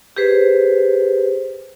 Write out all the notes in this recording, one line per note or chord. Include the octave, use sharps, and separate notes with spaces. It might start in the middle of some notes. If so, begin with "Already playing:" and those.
G4 G#4 B4 C5